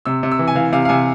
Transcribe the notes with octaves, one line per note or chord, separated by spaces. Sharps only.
C3 E6
C3
E6
E3
G#5
E3 F5
C3 F5
F5
C3 G#5